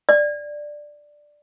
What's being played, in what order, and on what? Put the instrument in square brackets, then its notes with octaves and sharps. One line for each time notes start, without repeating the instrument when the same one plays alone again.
[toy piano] D5